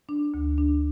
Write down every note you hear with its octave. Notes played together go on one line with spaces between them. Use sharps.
D4
D2
D4